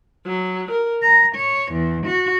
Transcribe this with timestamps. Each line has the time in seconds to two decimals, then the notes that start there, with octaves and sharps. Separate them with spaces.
0.26 F#3
0.71 A#4
1.02 A#5
1.35 C#5
1.71 E2
2.06 F#4